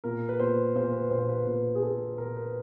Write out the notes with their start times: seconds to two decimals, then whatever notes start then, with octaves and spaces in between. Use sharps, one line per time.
0.04 A#2 A#4
0.29 B4
0.40 A#2 C5
0.75 A#2 C5
0.93 B4
1.10 A#1 C5
1.29 B4
1.46 A#2 B4
1.75 G#4
1.82 A#2 A4
2.18 A#1 A#4
2.36 B4